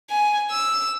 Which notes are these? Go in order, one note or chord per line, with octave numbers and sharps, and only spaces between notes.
G#5
E6